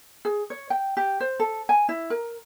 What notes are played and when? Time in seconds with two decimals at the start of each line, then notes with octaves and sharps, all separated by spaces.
0.25 G#4
0.50 C#5
0.70 G5
0.97 G4
1.20 C5
1.40 A4
1.69 G#5
1.89 E4
2.10 A#4